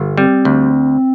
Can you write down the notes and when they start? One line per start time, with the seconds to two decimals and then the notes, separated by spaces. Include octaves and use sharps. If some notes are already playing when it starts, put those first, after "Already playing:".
Already playing: G1
0.17 G3 C4
0.45 D2